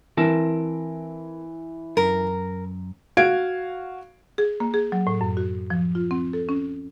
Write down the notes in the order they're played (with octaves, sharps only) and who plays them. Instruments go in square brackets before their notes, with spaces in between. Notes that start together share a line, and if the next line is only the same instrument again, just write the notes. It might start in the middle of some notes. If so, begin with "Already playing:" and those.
[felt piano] E3 [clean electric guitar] C4 A#4 A5
[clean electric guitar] F#2 [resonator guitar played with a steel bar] A#4
[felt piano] F#4 F5 G#6 D7
[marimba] G#4
A#3
G#4
F#3
A2
F#2
F#4
F3
F4
C4
A4
C#4